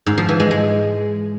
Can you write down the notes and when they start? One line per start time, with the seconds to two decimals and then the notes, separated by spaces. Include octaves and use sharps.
0.06 G#2
0.18 F3
0.29 E3
0.40 G#3
0.51 G#3